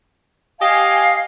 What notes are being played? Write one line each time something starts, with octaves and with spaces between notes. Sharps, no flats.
G4 D#5 F5 G#5